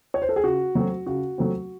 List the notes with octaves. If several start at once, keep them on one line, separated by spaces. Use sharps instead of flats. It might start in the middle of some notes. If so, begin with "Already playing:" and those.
C#5
C5
A4
G#4
C#3 F#4
F#3 A3 C4
C#3 F#4
F#3 A3 C4